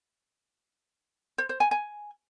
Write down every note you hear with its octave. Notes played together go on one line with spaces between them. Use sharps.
C5
C5
G#5
G#5